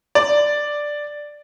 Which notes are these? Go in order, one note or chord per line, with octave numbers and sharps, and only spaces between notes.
D5